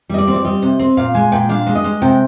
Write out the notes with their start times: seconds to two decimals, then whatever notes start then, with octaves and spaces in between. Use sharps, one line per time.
0.09 G3 D#5
0.18 D5
0.27 C4
0.34 D5
0.45 G3 D#5
0.62 C3
0.79 C4
0.97 A#2 F5
1.14 G#3 G#5
1.32 A#2 G5
1.49 D4 F5
1.66 G#3
1.75 D#5
1.84 G#3
2.02 C3 G5